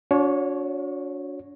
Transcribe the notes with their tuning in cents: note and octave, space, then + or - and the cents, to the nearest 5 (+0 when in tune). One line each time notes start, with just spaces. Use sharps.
D4 -40 F#4 -35 C#5 -10